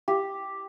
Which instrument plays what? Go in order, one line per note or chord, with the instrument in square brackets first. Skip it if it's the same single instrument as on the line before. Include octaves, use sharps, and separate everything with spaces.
[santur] G4